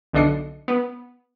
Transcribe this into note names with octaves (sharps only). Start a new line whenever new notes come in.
B1 D3 D4 D#5 C7 C#7
B3